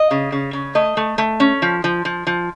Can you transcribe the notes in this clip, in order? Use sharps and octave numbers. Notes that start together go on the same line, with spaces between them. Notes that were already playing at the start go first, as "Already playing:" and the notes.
Already playing: D#5
C#3
C#3
C#3
A3 D#5
A3
A3
C#4
F3
F3
F3
F3